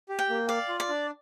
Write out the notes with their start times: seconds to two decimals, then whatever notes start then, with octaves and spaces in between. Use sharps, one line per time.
0.09 G4
0.19 G5
0.29 A#3
0.49 D5 F5
0.69 F4
0.80 D5
0.89 D4